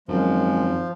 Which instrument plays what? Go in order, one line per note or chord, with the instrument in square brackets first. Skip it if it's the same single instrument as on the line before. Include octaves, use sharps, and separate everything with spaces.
[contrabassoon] G#1 [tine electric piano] F#2 [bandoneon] F3 [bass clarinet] G#3